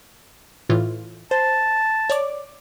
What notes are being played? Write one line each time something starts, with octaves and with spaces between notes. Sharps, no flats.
A2 E3 F4
C5 A5
C#5 D5 D6